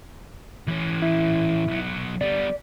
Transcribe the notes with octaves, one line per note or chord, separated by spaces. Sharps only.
E3 C#4
E4
B1 F#3
G3 B3 D5